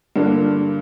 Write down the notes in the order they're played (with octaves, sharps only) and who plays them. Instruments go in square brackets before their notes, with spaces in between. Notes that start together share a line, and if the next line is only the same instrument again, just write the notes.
[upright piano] G2 D3 A#3 D4